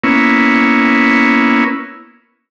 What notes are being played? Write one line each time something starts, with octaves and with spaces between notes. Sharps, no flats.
A#3 B3 C#4 E4